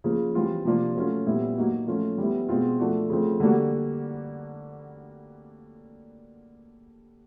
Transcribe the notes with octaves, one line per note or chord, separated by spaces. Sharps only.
C#3 F3 A#3
E3 G3 C4 F4
C3 F3 A#3 D4 F4
F#3 A3 C#4 F4
A#2 G3 B3 E4
F#3 A#3 D#4 F#4
F3 A3 C#4 F4
G3 B3 E4
B2 G#3 C4 F4
F3 A3 D4 F#4
C#3 F3 A3 C4
D3 G3 A#3 D4 F#4